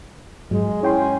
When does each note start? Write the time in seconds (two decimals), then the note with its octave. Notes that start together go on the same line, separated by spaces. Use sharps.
0.51 G#2 F#3 G#3
0.83 C#4 E4 G5 C6